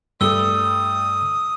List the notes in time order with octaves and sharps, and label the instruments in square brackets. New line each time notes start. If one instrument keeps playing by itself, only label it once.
[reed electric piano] G2 [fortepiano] G3 A3 [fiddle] D#6 [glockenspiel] E6 G7